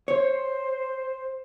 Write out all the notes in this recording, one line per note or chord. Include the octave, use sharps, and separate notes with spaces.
C5 C#5